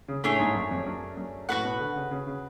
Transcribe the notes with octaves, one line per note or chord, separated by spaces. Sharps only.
C#3
A2 A3 D4 G#4 C#5
G#2
F#2
F2
F#2
F#2
A2 F#4 B4 F#5
B2
D3
C#3
C#3
C#3